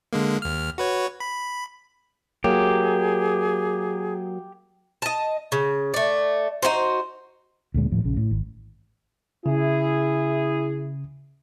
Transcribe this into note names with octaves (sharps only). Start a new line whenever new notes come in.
D3 G#3 A#3
D#2 F6
F#4 B4 C#5
B5
F#3 A#3 G4 G#4
D#5 A5
C#3
A3 D5
D#4 E4 F#4 C5
D2 A#2 G#3
D#1 A2 F3
A#1 C#3
A2
G#1
C#3 E4 G#4